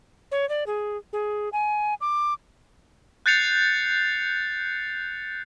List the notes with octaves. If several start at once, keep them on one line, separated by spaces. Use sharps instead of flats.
C#5
D5
G#4
G#4
G#5
D6
F#6 G6 A6 C7 C#7 F7